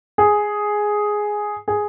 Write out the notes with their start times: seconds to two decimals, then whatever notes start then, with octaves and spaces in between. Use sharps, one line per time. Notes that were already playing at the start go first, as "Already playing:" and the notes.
0.18 G#4
1.68 G#4